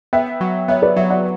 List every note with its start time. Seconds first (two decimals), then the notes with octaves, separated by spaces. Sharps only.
0.13 B3 E5 G5
0.41 F#3
0.68 B3 C#5 E5
0.82 B4 D5
0.96 F#3 C#5 E5
1.10 D5 F#5